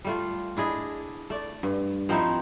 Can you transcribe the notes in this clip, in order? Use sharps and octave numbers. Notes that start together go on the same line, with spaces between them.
G3 A3 F4
D4 E4 G#4 D#5
A3 D5
G2
F3 C4 D#4 E4